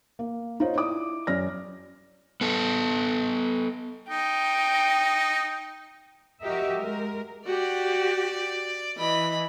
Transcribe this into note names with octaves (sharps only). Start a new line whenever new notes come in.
A#3
D#4 F4 C5 C#5
E4 D5 D6 D#6
F#2 C#4 D5 F6 A#6
B3 A4
D#4 G5
F3 F#4 G4 A#4 D#5 E5
G#3 A#4
F#4 G4 D5
E3 D#5 B5